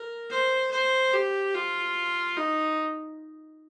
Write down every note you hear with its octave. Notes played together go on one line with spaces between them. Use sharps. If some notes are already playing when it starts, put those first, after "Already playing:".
Already playing: A#4
C5
C5
G4
F4
D#4